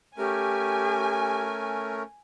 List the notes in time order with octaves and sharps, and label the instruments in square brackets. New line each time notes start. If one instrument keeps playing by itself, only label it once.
[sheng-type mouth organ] A3 C#4 A#4 [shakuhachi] G4 [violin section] G#5